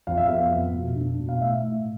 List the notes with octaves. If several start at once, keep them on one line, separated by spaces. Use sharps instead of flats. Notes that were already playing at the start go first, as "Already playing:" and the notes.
F2 F5
E5
B3 F5
F2
B2
D4
B2
F5
A2 E5
A2